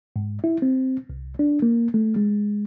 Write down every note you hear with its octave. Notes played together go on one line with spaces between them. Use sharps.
G#2
E4
C4
C2
D4
A#3
A3
G#3